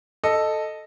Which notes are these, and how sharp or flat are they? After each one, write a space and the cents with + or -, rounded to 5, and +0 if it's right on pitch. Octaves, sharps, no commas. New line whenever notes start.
A4 +0 D#5 -10 A5 +0